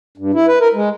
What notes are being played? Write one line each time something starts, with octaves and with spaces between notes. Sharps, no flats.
G2
E4
B4
A#4
G#3